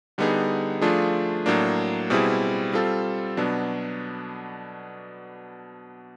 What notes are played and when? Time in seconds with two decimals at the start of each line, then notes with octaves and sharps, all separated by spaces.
0.18 D3 G3 B3 D#4 G#4
0.81 F3 A3 D4 F4 G#4
1.46 A2 F#3 A#3 D4
2.10 B2 G3 C4 E4 G#4
2.73 G3 C4 F4 A4
3.37 B2 F#3 B3 D4